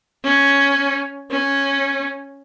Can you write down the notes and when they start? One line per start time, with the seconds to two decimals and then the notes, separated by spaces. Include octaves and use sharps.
0.24 C#4
1.31 C#4